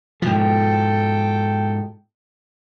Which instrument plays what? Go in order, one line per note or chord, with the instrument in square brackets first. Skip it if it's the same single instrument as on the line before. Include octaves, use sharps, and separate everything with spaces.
[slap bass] G#2 B2 F3 [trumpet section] A4 G5